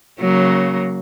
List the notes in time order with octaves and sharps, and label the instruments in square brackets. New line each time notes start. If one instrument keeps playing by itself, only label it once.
[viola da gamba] C#3 F#3 A#3